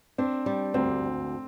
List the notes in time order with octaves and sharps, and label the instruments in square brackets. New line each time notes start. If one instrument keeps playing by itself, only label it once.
[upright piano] C4 [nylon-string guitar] D4
[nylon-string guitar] G3
[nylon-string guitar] D2 [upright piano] C4